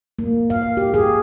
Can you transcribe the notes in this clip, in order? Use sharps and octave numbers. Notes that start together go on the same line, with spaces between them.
A#3
F5
G4
G#4